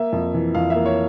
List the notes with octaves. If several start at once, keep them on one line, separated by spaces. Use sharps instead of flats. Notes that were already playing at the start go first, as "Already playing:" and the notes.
Already playing: A#3 E5
F2
E3
F2 F5
E5
A#3
C#5